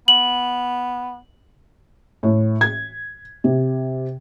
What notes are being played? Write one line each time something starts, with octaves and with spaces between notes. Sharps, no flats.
B3 F#7
A2
G#6
C3